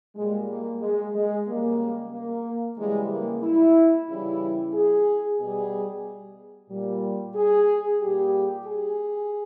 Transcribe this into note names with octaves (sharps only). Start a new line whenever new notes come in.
A#2 G3 G#3
A#3
G#3
G#3
C#3 G3 A#3
A#3
C#3 E3 G3 G#3
A#3
E4
C#3 E3 G3 E4
G#4
B2 G3 G#4
A#2 G3
G#4
A#2 G3 G4
G#4